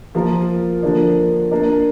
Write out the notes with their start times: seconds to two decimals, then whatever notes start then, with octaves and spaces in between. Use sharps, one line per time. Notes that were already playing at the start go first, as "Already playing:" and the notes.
0.15 F3 A#3 F4 A#4
0.83 D3 F3 A#3 D4
1.51 A#3 D4 A#4 D5